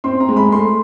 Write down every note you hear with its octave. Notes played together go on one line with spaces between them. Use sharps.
C4 C6
A#5
G#3
B5
A3 C6